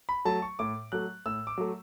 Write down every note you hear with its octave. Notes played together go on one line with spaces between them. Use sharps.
B5
F#3 A3 A5
C#6
A2 D6
F#3 A3 F#6
A2 E6
D6
F#3 A3